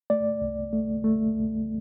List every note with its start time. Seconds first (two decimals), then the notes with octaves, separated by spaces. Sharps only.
0.10 A3 D5
0.42 C2
0.73 A3
1.04 A3
1.35 C2